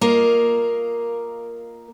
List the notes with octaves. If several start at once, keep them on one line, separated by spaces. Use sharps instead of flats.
A#3 F4 A#4 D#5